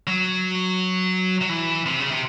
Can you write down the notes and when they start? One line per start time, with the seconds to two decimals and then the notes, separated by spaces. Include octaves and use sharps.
0.07 F#3
1.41 F#3
1.49 E3
1.86 C3
2.00 C#3
2.11 C3